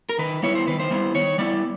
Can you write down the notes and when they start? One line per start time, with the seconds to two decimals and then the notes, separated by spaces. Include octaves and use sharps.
0.09 A#4
0.19 D#3 B4
0.43 G3 B3 E4 C#5
0.55 C5
0.67 D#3 B4
0.80 C5
0.90 G3 B3 E4
1.14 D#3 C#5
1.38 G3 B3 E4 D5